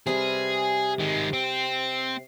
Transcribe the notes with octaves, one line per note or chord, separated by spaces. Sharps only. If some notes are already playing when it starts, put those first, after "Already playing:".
C3 G3 G#4 B4
D#3 G#3
C4